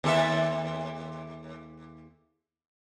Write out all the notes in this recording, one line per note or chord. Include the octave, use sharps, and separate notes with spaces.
D#2 A4 E5